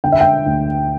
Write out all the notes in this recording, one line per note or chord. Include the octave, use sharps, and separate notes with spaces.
D3 G5
E5
G5
D2